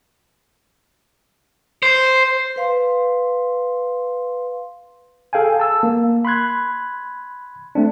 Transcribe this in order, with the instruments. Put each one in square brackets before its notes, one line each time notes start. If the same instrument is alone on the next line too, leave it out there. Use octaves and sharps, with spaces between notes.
[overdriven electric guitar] C5
[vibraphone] B4 F5 C6
[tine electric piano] G#4 A4 F5 G5 G#5
A5 E6
A#3
B5 C6 F#6 G#6
A3 C4 D4